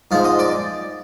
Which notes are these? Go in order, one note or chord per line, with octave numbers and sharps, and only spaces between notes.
G#2 F3 G#3 F5
D#5
D5